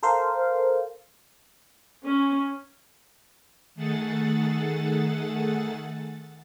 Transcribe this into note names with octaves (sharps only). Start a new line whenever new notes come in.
A4 A#4 C5 F5
C#4
D#3 A3 G#4 A4 F#5 A6